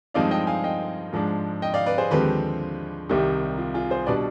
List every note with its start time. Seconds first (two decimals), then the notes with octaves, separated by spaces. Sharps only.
0.14 G2 F3 G#3 C4 D#4 D5 F5
0.31 D#5 G5
0.47 F5 G#5
0.64 D#5 G5
1.12 G#2 F3 G#3 D4
1.62 D#5 G5
1.74 D5 F5
1.86 B4 D5
1.98 G#4 C5
2.11 D#2 D3 F3 G#3 C4 G4 B4
3.09 C2 C3 D#3 G3 D#4 G4
3.58 F4
3.74 F4 G#4
3.90 G#4 C5
4.06 B2 G3 D4 B4 D5